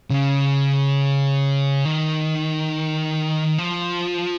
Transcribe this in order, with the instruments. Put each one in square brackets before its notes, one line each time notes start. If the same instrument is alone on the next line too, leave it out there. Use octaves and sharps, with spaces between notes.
[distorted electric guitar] C#3
D#3
F3